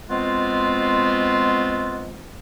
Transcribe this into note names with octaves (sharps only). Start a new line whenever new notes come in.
B2 F3 G#3 B3 C4 F4